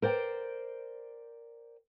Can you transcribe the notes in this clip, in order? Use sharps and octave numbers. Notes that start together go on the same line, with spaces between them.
A#4 C5 D5 G5